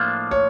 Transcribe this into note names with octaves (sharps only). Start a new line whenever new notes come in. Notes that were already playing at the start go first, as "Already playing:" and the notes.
Already playing: A2 F3 A#3 D4 F4
C#5